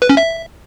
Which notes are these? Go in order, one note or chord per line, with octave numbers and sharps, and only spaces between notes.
B4
C#4
E5